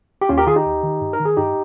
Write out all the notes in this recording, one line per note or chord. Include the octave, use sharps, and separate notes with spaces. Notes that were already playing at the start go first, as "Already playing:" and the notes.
G4
D#2 C#4 F4
G4 A#4
D#3 F4 G#4
D#4 G4
D#2
D#3
G2
A#4
D#3
G#4
G2 D#4 G4